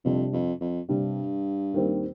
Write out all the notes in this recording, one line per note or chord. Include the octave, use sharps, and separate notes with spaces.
F2 C3 G3 D4
F2
F2
G2 C3 G3 D4
D#2 D#3 G3 C4